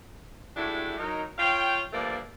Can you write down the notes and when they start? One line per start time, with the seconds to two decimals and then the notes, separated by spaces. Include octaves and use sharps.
0.56 G#3 A3 D4 E4 F#4 G4
0.98 F#3 D#4 A#4
1.38 F4 C#5 F5 G5
1.93 G2 F3 A3 A#3 D5